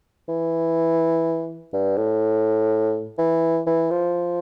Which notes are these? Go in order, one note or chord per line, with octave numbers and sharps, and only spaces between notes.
E3
G2
A2
E3
E3
F3